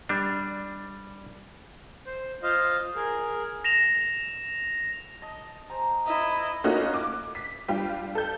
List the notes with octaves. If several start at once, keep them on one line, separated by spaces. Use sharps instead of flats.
G3 D4
C5
F4 C5 D#5 F5
G#4 A#4
A#6 E7 F7
D#5 A5
C5 G#5 A#5
E4 D#5
A3 A#3 C#4 D#4 F4 F#4
D6
B6
G3 D4 F4 G4
A4 G6